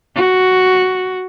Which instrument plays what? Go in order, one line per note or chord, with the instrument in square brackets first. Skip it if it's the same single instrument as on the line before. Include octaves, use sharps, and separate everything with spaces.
[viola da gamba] F#4